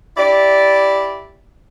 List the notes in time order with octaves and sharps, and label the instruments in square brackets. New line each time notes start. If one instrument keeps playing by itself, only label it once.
[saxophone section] E4 G4 D5